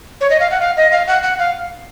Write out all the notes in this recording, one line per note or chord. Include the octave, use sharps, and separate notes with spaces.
C#5
D#5
F5
F#5
F5
D#5
F5
F#5
F#5
F5